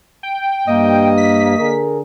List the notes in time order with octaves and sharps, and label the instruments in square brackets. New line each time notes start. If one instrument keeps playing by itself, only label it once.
[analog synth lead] G5
[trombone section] G2 [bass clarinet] A#3 [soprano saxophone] D#5
[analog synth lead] B6
[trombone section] D3 G#4 A#4